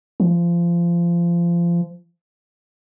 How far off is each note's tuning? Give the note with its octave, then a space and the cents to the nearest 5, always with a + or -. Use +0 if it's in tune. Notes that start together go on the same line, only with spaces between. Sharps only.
F3 -25